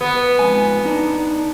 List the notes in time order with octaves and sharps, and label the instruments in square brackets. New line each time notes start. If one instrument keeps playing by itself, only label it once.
[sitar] B3
[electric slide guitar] F2 G#2 G#5
D4 D#4